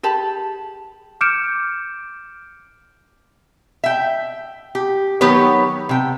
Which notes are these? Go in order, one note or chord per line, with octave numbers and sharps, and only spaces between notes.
G4 G#4 A5 B5
D6 F6 G6 C#7 D7 E7
E5 G5
G4
D#3 F#3 B3 G4 B4 C#5
C3 G5